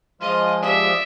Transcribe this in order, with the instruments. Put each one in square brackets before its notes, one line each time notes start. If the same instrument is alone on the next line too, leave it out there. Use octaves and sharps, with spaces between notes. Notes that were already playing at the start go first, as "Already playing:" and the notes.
[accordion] F3 G#3 [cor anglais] F4 [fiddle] D#5
[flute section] G4 F5 D#6 [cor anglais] D5 [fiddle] E5